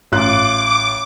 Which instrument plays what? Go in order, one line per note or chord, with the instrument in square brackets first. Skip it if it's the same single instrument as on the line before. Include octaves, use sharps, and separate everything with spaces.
[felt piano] A1 F4 F#6 [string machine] D6